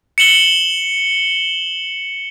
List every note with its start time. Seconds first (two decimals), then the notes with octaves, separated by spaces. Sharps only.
0.18 C#7 E7 F#7 G7